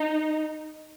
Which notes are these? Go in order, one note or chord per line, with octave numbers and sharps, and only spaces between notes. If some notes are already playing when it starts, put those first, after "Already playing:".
Already playing: D#4